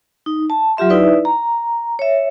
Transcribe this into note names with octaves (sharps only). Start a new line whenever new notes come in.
D#4
A5
F#3 F4 G4 E5 C6
D#4 E4 B4 D5 E5
A#5
C#5 E5